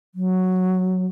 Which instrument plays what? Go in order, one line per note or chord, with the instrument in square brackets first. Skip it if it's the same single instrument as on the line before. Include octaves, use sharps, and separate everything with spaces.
[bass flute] F#3